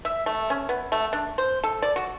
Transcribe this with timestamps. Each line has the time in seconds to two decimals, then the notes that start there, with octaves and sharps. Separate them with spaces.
0.05 E5
0.26 A3
0.50 C#4
0.69 B3
0.92 A3
1.13 D4
1.38 C5
1.64 A4
1.82 D5
1.96 F#4